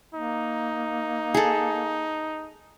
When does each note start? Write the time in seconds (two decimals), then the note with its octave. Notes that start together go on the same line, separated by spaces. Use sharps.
0.14 A#3 D#4
1.34 G#4 A4